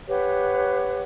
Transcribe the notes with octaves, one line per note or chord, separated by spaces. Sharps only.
G4 B4 C#5 F#5